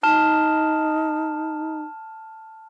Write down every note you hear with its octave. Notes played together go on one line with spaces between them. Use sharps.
D#4 A5 F6 E7